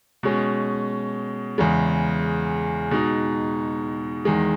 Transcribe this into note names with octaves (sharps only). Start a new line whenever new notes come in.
B2 G#3 C#4
E2 C#3 G#3
B2 G#3 D#4
E2 D#3 G#3